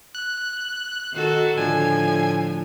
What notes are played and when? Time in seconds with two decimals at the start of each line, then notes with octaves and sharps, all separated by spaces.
0.15 F#6
1.13 D#3 F#4 A4
1.58 A2 D3 F3 G#5